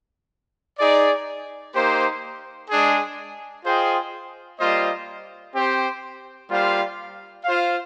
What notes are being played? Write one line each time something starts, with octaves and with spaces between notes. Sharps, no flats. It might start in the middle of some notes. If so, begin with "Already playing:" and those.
D#4 G#4 D5
A#3 D#4 G4 C5
G#3 D4 G#4
F4 G#4 C5 D#5 G5
G3 A#3 F4 C5 D#5
C4 G4 C5
G3 A#3 F4 C5 F5
F4 C5 F5